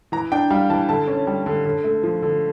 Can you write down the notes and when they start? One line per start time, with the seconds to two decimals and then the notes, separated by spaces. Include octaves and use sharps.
0.12 E3 A#5
0.32 D4 G5
0.50 G3 F5
0.70 E3 A5
0.89 D3 A5
1.08 C#4
1.27 G3
1.46 D3
1.65 D3
1.84 A3
2.03 F3
2.22 D3